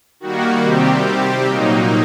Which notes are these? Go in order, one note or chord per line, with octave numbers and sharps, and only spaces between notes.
D#3 G3 A#3 F#4
C3 D#3 G3 C4 G4
C3 G3 C4
A#2 F#3 A#3 D#4